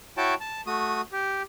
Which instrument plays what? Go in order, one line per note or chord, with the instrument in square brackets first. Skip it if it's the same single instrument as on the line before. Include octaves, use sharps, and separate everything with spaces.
[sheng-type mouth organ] E4 F#4 C#5 G5 A5
A5
A3 F#4 D#6
G4